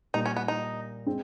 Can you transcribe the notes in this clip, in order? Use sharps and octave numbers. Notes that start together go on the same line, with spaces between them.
A#2 G3 A#3 D#4
C#4
B3
D#4
G#3 C4